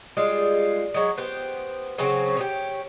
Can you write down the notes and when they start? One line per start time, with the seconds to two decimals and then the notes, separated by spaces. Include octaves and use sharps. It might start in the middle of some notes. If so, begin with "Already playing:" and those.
0.17 G3 G#3 F4
0.94 F#3 G#3
1.17 B3 G4 C5
1.98 C#3 F#3 C4 C#4
2.37 G4 G#4 C#5